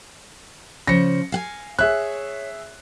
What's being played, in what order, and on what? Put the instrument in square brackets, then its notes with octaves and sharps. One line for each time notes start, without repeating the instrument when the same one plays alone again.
[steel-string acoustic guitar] C#3 F3 [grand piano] A#6 C#7
[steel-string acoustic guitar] F5 F#5 G#5
[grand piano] G#4 E5 F#6 [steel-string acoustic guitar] C#5